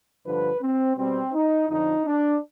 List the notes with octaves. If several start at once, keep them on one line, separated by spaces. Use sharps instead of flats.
G2 D3 F3 B4
C4
B2 G3 C4
D#4
F2 D3 F3 D#4
D4